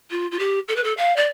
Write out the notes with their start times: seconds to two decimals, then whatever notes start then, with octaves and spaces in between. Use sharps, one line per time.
0.10 F4
0.31 F4
0.39 G4
0.68 A4
0.76 B4
0.83 A4
0.97 F5
1.16 D5